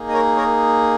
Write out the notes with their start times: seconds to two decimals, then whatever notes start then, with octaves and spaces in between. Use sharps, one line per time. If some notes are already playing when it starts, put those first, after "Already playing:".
Already playing: A#3 D#4 G#4
0.09 D#5
0.13 A#4 C#5
0.36 A#4 C#5